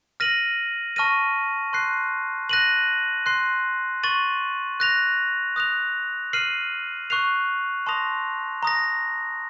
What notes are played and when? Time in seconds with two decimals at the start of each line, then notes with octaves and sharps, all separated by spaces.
0.20 F6 A#6 D#7 F#7
0.96 A5 C#6 F6 A#6 D#7
1.73 C6 F#6 C7
2.49 F#6 A#6 D#7 F#7
3.26 C6 F#6 C7
4.03 C#6 A6 D#7 F#7
4.80 F#6 A#6 F7
5.56 D#6 F#6 A#6 F7
6.33 F6 C7 D#7 F#7
7.10 C#6 F#6 C7 F7
7.86 A5 C6 D#6 A#6 F7
8.63 A#5 D#6 A#6